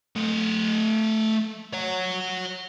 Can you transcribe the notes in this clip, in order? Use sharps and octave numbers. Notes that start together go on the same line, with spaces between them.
A3 D#5
C#5 F#5